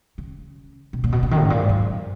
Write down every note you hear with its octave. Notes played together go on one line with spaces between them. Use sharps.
C#3
B2
A#2
B2
C#3
D#3
G#2
A#2
G#2
F#2